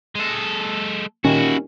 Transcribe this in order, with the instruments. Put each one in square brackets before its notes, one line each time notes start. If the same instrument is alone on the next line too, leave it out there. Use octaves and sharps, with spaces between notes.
[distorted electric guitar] G#3 A4
[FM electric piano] A#2 D#3 G3 [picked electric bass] C#4 [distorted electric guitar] E4 F#4